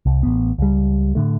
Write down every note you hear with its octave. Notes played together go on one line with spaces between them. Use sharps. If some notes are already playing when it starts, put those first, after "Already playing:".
C2
A1 B3
C#2 G3
A2 D3 A3